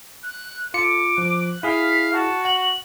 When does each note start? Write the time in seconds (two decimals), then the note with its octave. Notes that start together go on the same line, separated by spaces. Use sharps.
0.23 F#6
0.74 F4 A4 D6 C#7
1.18 F3 F#6
1.63 E4 G#4 F5 B6
2.14 F#4 A5
2.45 F#5 F#7